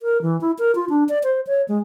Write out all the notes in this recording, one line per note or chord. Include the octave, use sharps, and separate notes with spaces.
A#4
E3
E4
A#4
F4
D4
D5
C5
C#5
G#3